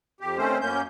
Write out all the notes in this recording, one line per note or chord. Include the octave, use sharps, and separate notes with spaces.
F2 G4
D#3 A3 C4 C#4 C5
F#2 A#3 C#4 G6